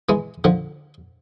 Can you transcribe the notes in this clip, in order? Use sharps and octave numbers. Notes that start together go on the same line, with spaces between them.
E3 G#3
D3 F3